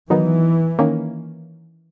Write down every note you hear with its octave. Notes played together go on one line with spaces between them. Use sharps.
D#3 E3 F#3 B3 D#4
D#3 A#3 C#4